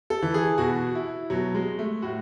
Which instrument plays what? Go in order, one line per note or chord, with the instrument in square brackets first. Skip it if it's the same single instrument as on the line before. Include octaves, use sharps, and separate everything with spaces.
[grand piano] A4
E3
G#4
B2 F#4
E4
B2 F#3
G#3
A3
A2 F#4